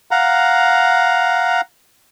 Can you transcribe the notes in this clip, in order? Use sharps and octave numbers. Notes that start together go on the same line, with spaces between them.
F5 F#5 A#5